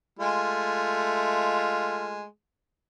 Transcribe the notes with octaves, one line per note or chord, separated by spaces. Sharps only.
G#3 A3 F4